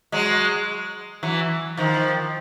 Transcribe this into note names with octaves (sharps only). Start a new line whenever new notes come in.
F#3 G#3
E3 F#3
D#3 F3